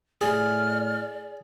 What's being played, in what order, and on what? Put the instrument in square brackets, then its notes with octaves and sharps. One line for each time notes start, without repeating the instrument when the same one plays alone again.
[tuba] A2 [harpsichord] G#4 [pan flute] D5 [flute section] F6